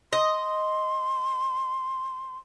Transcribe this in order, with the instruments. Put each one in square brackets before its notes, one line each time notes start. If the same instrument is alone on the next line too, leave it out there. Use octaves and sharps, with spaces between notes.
[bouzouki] D#5 [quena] C6